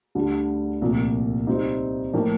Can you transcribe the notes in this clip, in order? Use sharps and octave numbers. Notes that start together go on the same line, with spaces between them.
D2 D3 G3 D4
C2 A#2 F3 A3
C3 G3 C4 D#4
A2 F3 A#3